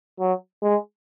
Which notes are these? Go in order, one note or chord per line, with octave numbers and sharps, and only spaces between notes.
F#3
G#3